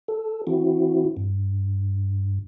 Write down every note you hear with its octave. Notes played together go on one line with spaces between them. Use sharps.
A4
E3 C4 E4 F#4
G2